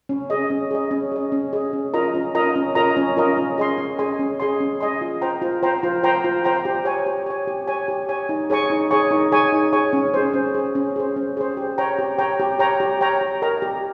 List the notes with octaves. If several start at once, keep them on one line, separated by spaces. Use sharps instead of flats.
C#4
G#4 D#5
C#4
G#4 D#5
C#4
G#4 D#5
C#4
G#4 D#5
C#4
F4 A#4 D#5 A#5
C#4
F4 A#4 D#5 A#5
C#4
F4 A#4 D#5 A#5
C#4
F4 A#4 D#5 A#5
C#4
G#4 D#5 G#5 C6
C#4
G#4 D#5 G#5 C6
C#4
G#4 D#5 G#5 C6
C#4
G#4 D#5 G#5 C6
F4
C5 G5 A#5
F4
C5 G5 A#5
F4
C5 G5 A#5
F4
C5 G5 A#5
G4
C#5 G#5
G4
C#5 G#5
G4
C#5 G#5
G4
C#5 G#5
D#4
G#4 C#5 G#5 C#6
D#4
G#4 C#5 G#5 C#6
D#4
G#4 C#5 G#5 C#6
D#4
G#4 C#5 G#5 C#6
C#4
G#4 C5
C#4
G#4 C5
C#4
G#4 C5
C#4
G#4 C5
G4
C#5 G5 A#5
G4
C#5 G5 A#5
G4
C#5 G5 A#5
G4
C#5 G5 A#5
G4
A#4 D#5 G5 A#5
G4